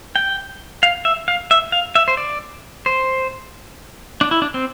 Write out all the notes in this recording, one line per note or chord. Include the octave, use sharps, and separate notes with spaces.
G5
F5
E5
F5
E5
F5
E5
C5
D5
C5
D4
E4
D4
C4